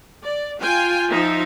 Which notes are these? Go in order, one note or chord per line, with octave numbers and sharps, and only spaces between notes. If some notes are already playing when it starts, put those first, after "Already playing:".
D5
F4 G5 G#5
F3 D#4 E5